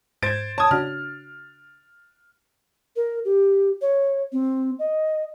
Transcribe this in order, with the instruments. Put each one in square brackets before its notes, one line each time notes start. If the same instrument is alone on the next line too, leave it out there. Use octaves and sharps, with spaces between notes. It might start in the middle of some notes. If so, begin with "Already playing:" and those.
[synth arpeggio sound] G#2 G#6 [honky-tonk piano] C5 A6 D7
[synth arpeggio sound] C#5 G#6 [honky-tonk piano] A5 D#6
[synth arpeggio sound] C#3 D4 F#4 [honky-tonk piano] F6
[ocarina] A#4
G4
C#5
C4
D#5